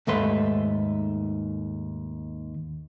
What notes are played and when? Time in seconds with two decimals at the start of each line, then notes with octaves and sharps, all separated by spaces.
0.07 D#2 G#2 A3 B4 C6